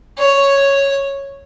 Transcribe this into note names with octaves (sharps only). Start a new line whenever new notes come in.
C#5